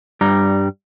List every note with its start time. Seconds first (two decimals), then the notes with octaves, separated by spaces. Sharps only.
0.21 G2 G3 A#5